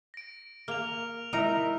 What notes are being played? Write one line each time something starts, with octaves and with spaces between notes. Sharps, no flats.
A#6 D7
A#3 F6 F7
G#3 D#4 E4 A#4 E5